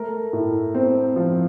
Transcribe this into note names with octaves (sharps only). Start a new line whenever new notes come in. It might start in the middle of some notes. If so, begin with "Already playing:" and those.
Already playing: A3 A#4
A2
C4
F3